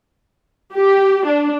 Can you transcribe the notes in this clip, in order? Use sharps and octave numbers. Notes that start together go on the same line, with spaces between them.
G4
D4